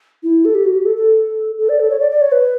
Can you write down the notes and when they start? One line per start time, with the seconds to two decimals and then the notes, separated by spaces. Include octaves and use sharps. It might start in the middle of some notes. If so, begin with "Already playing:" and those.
0.23 E4
0.45 A4
0.54 G4
0.65 F#4
0.75 G4
0.85 A4
0.96 A4
1.58 A4
1.69 D5
1.80 A4
1.90 C#5
2.00 D5
2.11 D5
2.21 C#5
2.32 B4